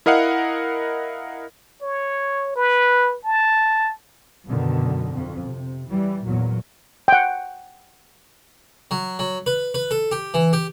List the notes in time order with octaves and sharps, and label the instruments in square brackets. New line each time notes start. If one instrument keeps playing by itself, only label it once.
[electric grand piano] E4 A#4 D#5 F5 F#5
[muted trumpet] C#5
B4
A5
[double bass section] F#2 B2 D3 D#3
F2
C3
E3 G3
E2 A#2 F#3
[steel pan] F#5 G5
[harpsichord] F#3
F#3
B4
B4
A4
G4
E3
G4